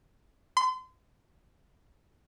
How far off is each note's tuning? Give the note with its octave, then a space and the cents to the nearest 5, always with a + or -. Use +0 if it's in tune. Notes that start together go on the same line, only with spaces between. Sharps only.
C6 -35